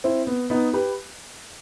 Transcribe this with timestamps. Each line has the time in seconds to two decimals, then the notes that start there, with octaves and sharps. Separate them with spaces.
0.04 C4 E4
0.27 B3
0.50 B3 D#4
0.73 G4 B4